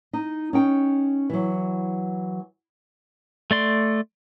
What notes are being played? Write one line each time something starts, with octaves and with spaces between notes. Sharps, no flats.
D#4
C#4 D#4 G5
E3 F#3
A3 D5 C6